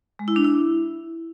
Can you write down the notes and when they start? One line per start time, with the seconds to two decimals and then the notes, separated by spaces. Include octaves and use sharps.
0.19 G#3
0.28 E4
0.36 D4
0.44 E4